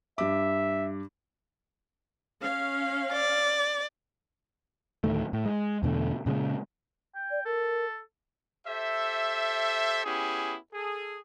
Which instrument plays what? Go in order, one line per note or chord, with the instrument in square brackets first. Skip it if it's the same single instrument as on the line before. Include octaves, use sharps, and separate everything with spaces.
[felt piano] G2 D6 [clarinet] E5
[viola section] C#4 F5
[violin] D5
[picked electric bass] D2 A2 D#3 A3
A2
G#3
E2 B2 D3 A3
A#2 C#3 G3 G#3
[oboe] G5
[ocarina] D5
[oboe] A4 [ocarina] A#4
[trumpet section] G4 A4 C5 E5
B3 C#4 E4 G4 G#4
G#4 A4